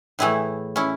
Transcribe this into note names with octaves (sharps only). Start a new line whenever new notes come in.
A2 E3 A3 E4 G#4
C#4 E4